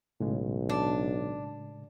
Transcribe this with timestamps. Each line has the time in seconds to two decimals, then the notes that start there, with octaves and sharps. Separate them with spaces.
0.20 B1 A2 C#3 G#3
0.69 D4